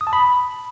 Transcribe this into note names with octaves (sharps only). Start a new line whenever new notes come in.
D#6
A5
B5